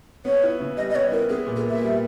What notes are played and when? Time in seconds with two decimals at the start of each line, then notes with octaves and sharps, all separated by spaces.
0.25 B3 C#5
0.43 E4
0.60 C#3
0.77 G3 D#5
0.90 D#5
0.95 B3 C#5
1.12 E4 A#4
1.29 B3 G#4
1.47 A#2
1.56 G#4
1.65 A#2 E5
1.82 G3